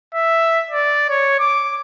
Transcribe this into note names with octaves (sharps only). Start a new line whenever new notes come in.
E5
D5
C#5
D6